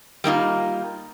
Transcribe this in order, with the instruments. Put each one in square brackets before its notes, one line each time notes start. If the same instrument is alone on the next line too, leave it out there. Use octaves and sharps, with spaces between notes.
[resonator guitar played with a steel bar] G3 A#3 D#4 F4